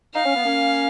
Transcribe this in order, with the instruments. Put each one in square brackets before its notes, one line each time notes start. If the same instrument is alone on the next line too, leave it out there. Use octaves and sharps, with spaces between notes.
[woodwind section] D#4 [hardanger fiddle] F5
[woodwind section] C#4
B3
A#3 C#4